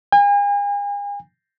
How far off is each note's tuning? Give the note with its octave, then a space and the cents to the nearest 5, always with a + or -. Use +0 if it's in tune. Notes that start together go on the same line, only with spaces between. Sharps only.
G#5 -40